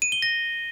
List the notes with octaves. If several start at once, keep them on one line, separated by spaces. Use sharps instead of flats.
D#7
G7
A#6